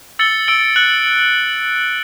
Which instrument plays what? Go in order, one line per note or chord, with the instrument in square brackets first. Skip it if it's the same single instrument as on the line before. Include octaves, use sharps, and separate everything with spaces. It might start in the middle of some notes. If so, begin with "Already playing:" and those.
[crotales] E6 A6 C#7 G7
E6 A6 D7 G7
F#6 C#7 F#7